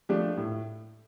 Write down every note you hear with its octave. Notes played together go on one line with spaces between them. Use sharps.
F3 A3 D4 G4
A2